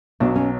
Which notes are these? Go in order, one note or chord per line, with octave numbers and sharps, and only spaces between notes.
B1 B2 F#3 D4
C#4